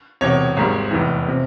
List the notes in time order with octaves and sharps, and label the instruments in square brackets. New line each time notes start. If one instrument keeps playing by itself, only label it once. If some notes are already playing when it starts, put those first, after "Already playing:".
[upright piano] E1 E2 C3 C#5
G#1 G#2 G3
F1 E2 E3
C3 F3